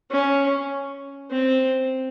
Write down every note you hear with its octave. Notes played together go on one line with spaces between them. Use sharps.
C#4
C4